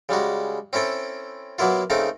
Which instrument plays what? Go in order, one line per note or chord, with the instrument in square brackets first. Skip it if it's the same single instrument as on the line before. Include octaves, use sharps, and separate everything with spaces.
[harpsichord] C#3 G3 G#3 F#4
C4 C#4 E4 A4 G5
B2 F#3 A#3 E4 F4
C#3 A3 C4 D#4 A#4